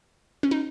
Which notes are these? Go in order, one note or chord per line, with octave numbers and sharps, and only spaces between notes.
C#4
D#4